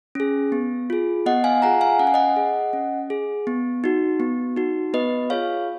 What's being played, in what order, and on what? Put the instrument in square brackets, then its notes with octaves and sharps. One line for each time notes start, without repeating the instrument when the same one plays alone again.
[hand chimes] C#4 G#4
B3
F4 G#4
B3 D#5 F#5
F5 G#5
F4 G#4 F#5 A#5
F5 G#5
C#4 F#5
G#5
D#5 F#5
G#4
C#4
G#4
B3
D#4 F#4
B3
D#4 F#4
B3 B4 D#5
F4 G#4 C#5 F5